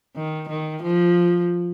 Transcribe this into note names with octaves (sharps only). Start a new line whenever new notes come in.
D#3
D#3
F3